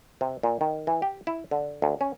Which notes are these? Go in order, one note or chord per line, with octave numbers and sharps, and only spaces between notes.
C3
A#2
D#3
E3
G4
E4
D3
D2
C#4